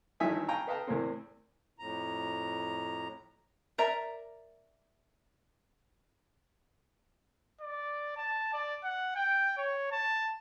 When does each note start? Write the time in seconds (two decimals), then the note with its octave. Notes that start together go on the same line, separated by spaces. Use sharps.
0.20 G#1 G2 E3 D#4 E5 G#5
0.48 F5 G5 G#5 A#5 C#6
0.67 B4 D#5 F5 G5 A5 A#5
0.87 E2 A2 E3 A#3 C4
1.79 F2 A2 A#5
3.78 A#4 D5 E5 A#5
7.61 D5
8.17 A5
8.53 D5
8.84 F#5
9.16 G5
9.57 C#5
9.92 A5